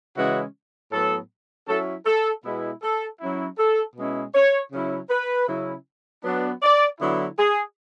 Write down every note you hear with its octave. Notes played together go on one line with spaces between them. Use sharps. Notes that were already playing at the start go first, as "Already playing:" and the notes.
C#3 E3 G#3 C#4 E4 F#4
A2 F#3 B3 A4
F#3 C#4 E4 A4
A4
B2 G#3 B3 E4
A4
F#3 C#4 E4
A4
B2 G#3 C#4 E4
C#5
C#3 F#3 C#4 E4
B4
C#3 F#3 C#4 E4
F#3 B3 D4
D5
D3 F#3 B3 E4
G#4